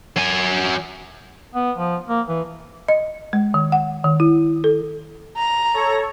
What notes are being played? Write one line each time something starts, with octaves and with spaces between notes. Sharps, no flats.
F#3 G#5
B3
F3
A#3
E3
D#5
G#3
D#3
F#5
D#3
E4
A4
A#5
A4 C#5